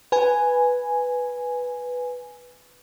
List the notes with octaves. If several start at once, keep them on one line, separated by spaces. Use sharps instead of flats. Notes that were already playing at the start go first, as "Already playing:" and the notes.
B4 G#5